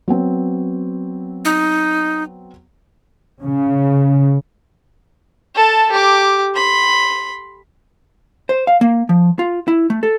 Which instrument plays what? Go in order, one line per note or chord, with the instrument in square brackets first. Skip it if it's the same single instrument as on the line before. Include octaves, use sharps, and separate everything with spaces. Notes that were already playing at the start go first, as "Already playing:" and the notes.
[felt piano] F#3 B3 C4
[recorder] D#4
[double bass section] C#3
[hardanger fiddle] A4 A5
G4 D6
B5 C6
[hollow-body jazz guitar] C5
F5
A#3
F3
F4
E4
A3
A4